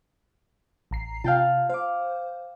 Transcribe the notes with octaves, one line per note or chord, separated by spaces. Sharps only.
A1 A#5 C7
C3 F4 F5 G5 A5
C5 F5 D6